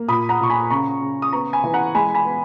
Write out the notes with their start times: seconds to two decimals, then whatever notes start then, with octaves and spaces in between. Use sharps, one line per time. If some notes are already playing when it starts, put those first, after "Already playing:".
Already playing: A#3
0.08 A#2 B5 D#6
0.29 F#5 A#5
0.40 A#2 C#6
0.50 G#5 B5
0.71 C#3 A#5 C#6
1.01 C#3
1.22 D#6
1.33 B3 A#5 C#6
1.53 G#5 B5
1.64 E3
1.73 F#5 A#5
1.95 G#3 G#5 B5
2.15 G#5 B5
2.25 B3